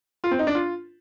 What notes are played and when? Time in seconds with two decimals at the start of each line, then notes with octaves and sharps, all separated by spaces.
0.24 F4
0.31 C4
0.39 D#4
0.47 D4
0.55 F4